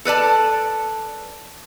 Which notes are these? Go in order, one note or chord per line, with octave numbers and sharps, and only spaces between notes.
A4 B4 D5 A5